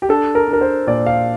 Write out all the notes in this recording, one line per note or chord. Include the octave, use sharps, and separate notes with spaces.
G4
D4 A4
A#4
D4
A#4
C5
A#2 D5
F5